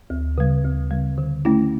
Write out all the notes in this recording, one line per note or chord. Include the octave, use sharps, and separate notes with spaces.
D2
C#3 G3
D2
C#3 G3
D3
A3 C#4 E4